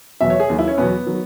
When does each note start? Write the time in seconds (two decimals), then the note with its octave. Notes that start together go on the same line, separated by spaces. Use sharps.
0.21 E2 B2 F#3 E5
0.30 C#5
0.40 G#4
0.50 D#2 D#3 F#3
0.59 E4
0.68 C#4
0.78 E2 B2 F#3 B3
1.06 D#3 F#3